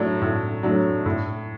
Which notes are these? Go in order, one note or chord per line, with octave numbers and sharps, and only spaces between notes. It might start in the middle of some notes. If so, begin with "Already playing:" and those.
Already playing: A2 F#3 A3 D4
A2
F#3 A3 D4
A2